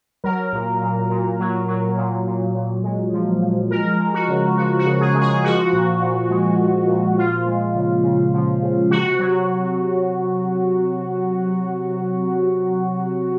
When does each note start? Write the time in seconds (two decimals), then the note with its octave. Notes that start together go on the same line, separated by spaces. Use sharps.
0.24 F#3 A#4
0.53 A#2
0.81 A#2
1.10 A#2
1.40 F#3
1.68 F#3
1.97 A#2
2.26 A#2
2.54 A#2
2.83 G#3
3.13 F3
3.41 F3
3.71 G#3 A#4
3.99 G#3
4.14 F#4
4.28 C#3
4.57 F3 F#4
4.79 F#4
4.86 C#3
5.01 G#4
5.14 G#3
5.21 G#4
5.44 F3 F#4
5.73 A#2
6.01 A#2
6.30 G#3
6.59 A#2
6.88 A#2
7.17 F3 F4
7.46 G#3
7.75 C#3
8.03 C#3
8.33 F3
8.62 C#3
8.91 C3 F#4
9.19 F#3